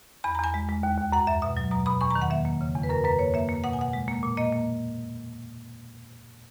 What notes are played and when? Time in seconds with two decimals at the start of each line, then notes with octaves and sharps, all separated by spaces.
0.24 E2 B5
0.35 A#5
0.39 E2 G#5
0.54 G#3
0.69 G#3
0.83 D#2
0.98 D#2
1.12 F#2 F#5
1.27 F#2 E5
1.42 B2 E5
1.57 F#3
1.71 B2 A#5
1.86 B2 B5
2.01 E2 C#6
2.10 A#5
2.15 D#3
2.22 F#5
2.30 A#3 E5
2.45 A#3
2.61 C#3
2.75 E2
2.83 B4
2.89 F#2 A#4
3.04 F#2 B4
3.19 A#3 C#5
3.34 A#3 E5
3.49 A#3
3.64 B2 F#5
3.73 G#5
3.79 B2 F#5
3.93 G#3
4.08 A#3
4.23 A#2
4.37 A#3 D#5
4.53 A#3